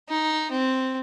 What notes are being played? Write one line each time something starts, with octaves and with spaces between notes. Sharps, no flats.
D#4
C4